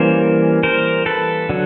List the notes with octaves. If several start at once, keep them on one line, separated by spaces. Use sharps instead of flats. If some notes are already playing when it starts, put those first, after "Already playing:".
Already playing: E3 G3 A#3 C#4 A#4 C5
A#4 C5
A4 B4
D3 F#3